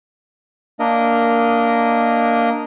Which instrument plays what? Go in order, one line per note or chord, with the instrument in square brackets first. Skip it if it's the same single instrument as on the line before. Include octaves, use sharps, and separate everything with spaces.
[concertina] A#3 D4 A#4 D#5